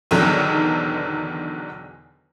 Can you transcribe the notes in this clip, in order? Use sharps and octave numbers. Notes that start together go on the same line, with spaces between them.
B1 E2 B2 D3 D#3 F#3